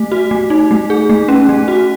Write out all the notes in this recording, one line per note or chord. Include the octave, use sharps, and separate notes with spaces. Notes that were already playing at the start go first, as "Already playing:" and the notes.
Already playing: A3
F#4
A3
D#4
A3
G#4
A3
C#4
A3
F#4